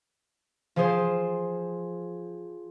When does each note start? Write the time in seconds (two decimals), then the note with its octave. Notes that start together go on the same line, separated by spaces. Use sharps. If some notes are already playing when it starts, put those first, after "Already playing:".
0.76 F3 F4 G#4 C5